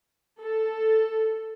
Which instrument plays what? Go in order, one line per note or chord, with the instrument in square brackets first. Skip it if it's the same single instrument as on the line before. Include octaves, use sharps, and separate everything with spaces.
[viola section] A4